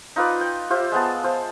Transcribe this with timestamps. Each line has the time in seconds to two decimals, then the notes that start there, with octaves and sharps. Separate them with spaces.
0.16 D#4 F4 B4 D5
0.41 G5
0.70 F4 G4 C5 E5
0.92 G#3 B3 A5
1.24 C5 F5